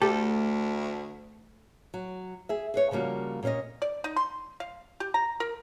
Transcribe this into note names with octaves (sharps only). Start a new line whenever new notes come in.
D2 A3 G4 A4
F#3
G#4 E5
G#4 B4 C#5
C#3 F3 G3 A#3 F#4
A#2 C#4 C5 C#5 D#5
D5
D#4
C6
F5
G4
A#5
A#4